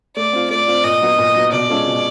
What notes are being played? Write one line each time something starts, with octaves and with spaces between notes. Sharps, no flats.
A3 D5
C4 F4
A3 D5
C4 F4
A#2 D#5
F#3 B3
A#2
F#3 B3
B2 D5
G#3 C#4 F4 A4
B2